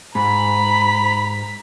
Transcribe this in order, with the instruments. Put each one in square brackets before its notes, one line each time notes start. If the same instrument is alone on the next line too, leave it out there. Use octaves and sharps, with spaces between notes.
[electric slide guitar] G#2 [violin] A#5 B6 [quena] B5